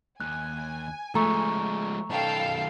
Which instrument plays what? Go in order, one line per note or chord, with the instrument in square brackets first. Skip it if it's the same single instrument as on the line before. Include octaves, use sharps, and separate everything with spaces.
[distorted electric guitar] D#2 [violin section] G#5 [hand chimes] F#6
[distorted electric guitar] F3 G#3 [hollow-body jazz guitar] A3 [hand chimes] A#5 C#6
[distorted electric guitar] B1 D#3 [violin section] A4 F5 G5